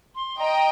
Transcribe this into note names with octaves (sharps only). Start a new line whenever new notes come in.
C6
D#5 G5 A#5